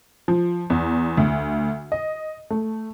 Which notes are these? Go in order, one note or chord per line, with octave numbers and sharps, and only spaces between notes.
F3
E2
D2
D#5
A3